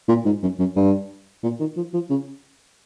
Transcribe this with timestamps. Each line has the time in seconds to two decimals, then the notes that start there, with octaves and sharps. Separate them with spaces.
0.08 A#2
0.26 G#2
0.42 F#2
0.59 F#2
0.76 G2
1.43 A#2
1.60 D#3
1.77 F3
1.93 F3
2.10 C#3